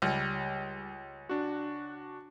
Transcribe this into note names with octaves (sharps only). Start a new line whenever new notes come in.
C#2 G3
D4 F#4